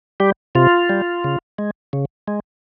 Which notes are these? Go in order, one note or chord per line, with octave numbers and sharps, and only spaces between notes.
G3 G4
C3 F4
G3
C#3
G#3
C#3
G#3